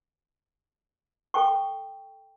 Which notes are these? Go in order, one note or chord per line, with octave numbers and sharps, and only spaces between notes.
A4 G5 C#6